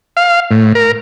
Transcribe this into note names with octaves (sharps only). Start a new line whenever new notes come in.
F5
A2
A#4